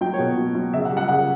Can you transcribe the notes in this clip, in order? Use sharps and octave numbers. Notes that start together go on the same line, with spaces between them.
F#3 G5
C#5
B2
F#3
F#3
C#3 E5
F#5
G3
F#5
C#3 F#5